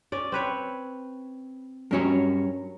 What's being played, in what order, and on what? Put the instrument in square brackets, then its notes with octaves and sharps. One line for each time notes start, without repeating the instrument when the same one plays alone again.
[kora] C#4 D5
C4 B4 C#5
[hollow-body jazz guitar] G2 C#4 C#5 [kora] F#3 A#4